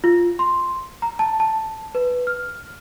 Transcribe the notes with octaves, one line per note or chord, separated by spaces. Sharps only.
F4
C6
A#5
A5
A5
B4
F6